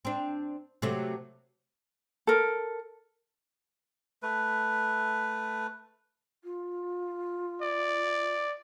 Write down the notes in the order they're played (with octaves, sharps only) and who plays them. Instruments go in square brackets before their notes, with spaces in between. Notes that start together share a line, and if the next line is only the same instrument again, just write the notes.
[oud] C4 D4
C3 F#3 A3
[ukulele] A4 A#4
[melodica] A3 B4
[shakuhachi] F4
[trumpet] D5